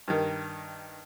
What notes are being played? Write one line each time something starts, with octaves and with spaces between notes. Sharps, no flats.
G2 D#3